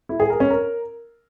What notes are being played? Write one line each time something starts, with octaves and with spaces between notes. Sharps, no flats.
E4
G#4
A#4
C#4
A#4